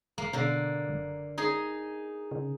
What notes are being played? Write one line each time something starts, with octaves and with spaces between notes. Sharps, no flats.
F#1 A#3
B2 D3 A#3
F#1
D#4 G#4
C#3